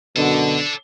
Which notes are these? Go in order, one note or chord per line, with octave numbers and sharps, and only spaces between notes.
F#2 B2 D3 D4 A4